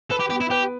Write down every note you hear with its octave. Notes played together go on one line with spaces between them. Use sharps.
A4 B4
G4
B3 G4
E4
G4 B4